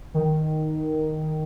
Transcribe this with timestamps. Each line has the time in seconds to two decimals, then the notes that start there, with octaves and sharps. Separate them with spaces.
0.14 D#3